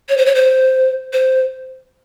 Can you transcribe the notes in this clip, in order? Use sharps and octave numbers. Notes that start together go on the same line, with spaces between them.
C#5
C5
C#5
C5
C5